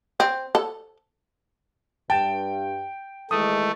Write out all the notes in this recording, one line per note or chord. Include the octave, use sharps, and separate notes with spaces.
C4
A4
G2 G5 A5
D#3 E3 G#3 A3 D#6